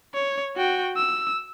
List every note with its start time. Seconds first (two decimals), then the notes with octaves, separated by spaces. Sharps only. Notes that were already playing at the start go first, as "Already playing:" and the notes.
0.14 C#5
0.57 F#4 G5
0.96 E6